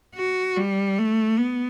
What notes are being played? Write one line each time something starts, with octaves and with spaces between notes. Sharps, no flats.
F#4
G3
A3
B3